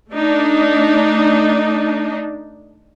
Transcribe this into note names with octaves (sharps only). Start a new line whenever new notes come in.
A3 D4 D#4